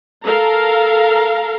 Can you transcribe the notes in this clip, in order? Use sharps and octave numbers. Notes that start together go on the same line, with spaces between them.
A4 A#4 F5 A#5